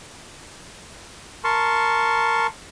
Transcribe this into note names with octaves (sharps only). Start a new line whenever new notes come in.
A#4 A5 C6 C#6